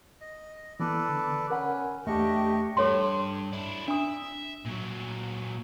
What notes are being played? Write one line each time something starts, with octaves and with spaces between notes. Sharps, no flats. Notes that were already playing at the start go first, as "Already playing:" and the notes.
D#5
E3 B3 A4 B4 D5
D3
C#4 A#4 F#5 B5
E2 A3 D4 G4 D#5 E5 C#6
G2 A4 C#5 C6
D4 E4
D4 E5 D#6
A#2 F#3